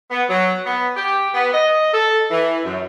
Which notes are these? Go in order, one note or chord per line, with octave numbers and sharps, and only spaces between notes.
B3
F#3
B3
G4
B3
D#5
A4
E3
F#2